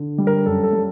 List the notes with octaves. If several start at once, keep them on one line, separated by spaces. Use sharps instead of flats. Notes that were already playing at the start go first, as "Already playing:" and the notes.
Already playing: D3
G3
A#4
F#2 A4
A4
G3